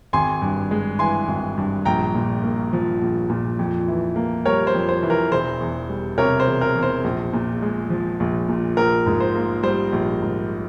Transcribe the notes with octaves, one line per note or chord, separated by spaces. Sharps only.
G#1 G#5 C6
G2
G#3
E3 G#5 C6
G#1
G2
A#1 G5 A#5
A#2
A#3
F3
A#1
A#2
F2
E3
A#3
G3 A#4 C#5
C5
F2
C5
E3
A#4
E1 C5
E2
G3
C3 A#4 C#5
C5
E1
A#4
E2
C5
A#1
A#2
G#3
F3
A#1
A#2
A#1 A#4
G#2
C5
A#3
G3 C5
A#1
G#2